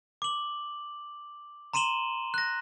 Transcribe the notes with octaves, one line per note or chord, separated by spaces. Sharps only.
D6 F#7
A#5 C6 D#7 E7 F#7 G7
F#6 A#6